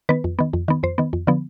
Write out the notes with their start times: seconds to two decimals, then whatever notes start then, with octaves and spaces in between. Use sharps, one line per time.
0.09 D#3 B3 B4
0.24 F2
0.39 D#3 B3
0.53 F2
0.68 D#3 B3
0.83 F2 C5
0.98 D#3 B3
1.13 F2
1.27 D3 F3 B3